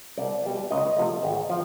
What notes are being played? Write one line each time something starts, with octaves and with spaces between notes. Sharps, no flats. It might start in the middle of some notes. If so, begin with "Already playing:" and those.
C2 D5
B2 G3
C#2 D#5
C3 F3 A3
G#1
F3